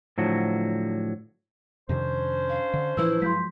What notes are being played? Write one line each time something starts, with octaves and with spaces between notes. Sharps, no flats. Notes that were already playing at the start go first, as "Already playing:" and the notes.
A2 D3 F3 F#3 F#4
F2 C3 D#3 C#4 D4 C5
F5
D3
A2 E3 F3 E4 B4 E6
G2 F3 F#3 G#3 C6 G6 B6